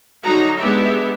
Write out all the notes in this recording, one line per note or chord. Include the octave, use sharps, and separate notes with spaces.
D3 F#3 D#4 F#4 A#5
G#3 B3 D4 G4 E5